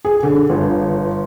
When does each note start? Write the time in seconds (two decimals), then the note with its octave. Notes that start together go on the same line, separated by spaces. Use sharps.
0.05 G#4
0.23 D3
0.50 G1